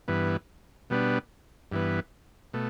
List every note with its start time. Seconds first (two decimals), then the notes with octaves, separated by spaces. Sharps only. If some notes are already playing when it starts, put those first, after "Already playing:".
0.08 G2 E3 B3
0.90 B2 G3 B3 D4
1.72 G2 E3 B3
2.54 B2 A3